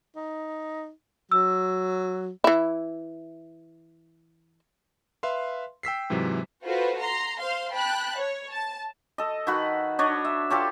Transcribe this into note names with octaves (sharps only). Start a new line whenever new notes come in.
D#4
F#3 E6
E3 E4
B4 E5 F5 C6
G5 E6 B6 C7
G#2 C3 E3 F#3
F4 F#4 A4 B4 C5
A#5 C6
C5 F5 C6
G5 A5 B5 F#6
C#5
A5
A4 D#5
D#3 F#4 B4 F#5
D4 C#5 D#5
E5
F4 G4 A4 C#5